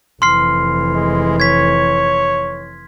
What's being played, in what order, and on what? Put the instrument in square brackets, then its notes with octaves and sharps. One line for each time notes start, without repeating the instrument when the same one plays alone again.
[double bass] F1 E3 [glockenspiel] C6 F6 C7
[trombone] G#3
[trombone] C#5 [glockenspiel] G#6 B6